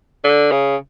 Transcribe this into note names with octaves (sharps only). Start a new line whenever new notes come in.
D3
C#3